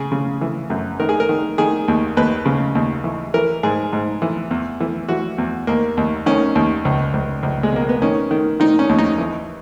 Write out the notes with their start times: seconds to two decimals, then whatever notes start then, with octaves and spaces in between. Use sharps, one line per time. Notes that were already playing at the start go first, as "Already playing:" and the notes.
Already playing: C#3 G#4
0.12 C#3
0.41 E3
0.70 F#2
1.00 D#3 A#4
1.09 G#4
1.20 A#4
1.29 D#3
1.58 D#3 G#4
1.88 D#2
2.17 D#2 B4
2.46 C#3
2.75 D#2
3.04 E3
3.34 E3 A#4
3.63 G#2 G#4
3.93 G#2
4.22 E3
4.51 E2
4.80 E3
5.08 E3 F#4
5.38 E2
5.67 D#2 A#3
5.97 D#2
6.26 D#3 C#4
6.55 D#2
6.85 C#2
7.14 C#2
7.43 C#2
7.63 G#3
7.73 B2 A#3
7.89 B3
8.02 D#3 C#4
8.31 D#3
8.60 D#3 D#4
8.79 C#4
8.89 D#2
8.99 D#4
9.18 E3